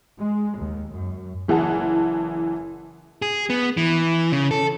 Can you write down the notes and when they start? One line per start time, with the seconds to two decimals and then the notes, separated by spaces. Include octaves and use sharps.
0.18 G#3
0.57 D#2
0.92 F#2
1.48 F#1 E3 G#4 F#5 A5
3.22 G#4
3.50 B3
3.77 E3
4.32 C#3
4.51 A4